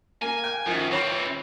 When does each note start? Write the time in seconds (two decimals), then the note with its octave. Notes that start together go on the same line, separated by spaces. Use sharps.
0.22 A#3 G#5
0.44 G5
0.66 F#2 D#3 F3 F4
0.91 E3 C4 F4 C#5 B5